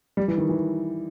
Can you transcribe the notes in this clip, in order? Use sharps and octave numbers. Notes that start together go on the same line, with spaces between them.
G3
E3
D#3
E3